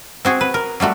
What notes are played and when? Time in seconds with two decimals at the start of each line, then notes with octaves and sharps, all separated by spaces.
0.25 C4 F#4 G#4
0.41 B4
0.54 A#4
0.80 F#3 G3 A3 F#4